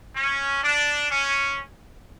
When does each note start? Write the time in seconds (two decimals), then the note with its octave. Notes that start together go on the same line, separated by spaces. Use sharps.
0.16 C#4
0.64 D4
1.11 C#4